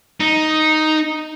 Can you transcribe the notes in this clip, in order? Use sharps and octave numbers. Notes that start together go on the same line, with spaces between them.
D#4